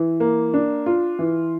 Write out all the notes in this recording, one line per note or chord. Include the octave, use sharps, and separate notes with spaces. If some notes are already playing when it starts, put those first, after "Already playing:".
Already playing: E3
A#3
D4
F4
E3